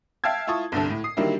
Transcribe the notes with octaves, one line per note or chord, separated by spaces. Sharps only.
E5 F5 G5 A5 E6 G#6
E4 F4 A5 C#6 D#6
G1 C2 D3 A4
A2
D#6 C7
D3 D#3 F#3 G3 A#3 E4